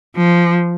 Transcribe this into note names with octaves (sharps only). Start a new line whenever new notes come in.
F3